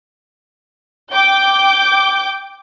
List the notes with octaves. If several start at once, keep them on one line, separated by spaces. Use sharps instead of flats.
G5 D6 G6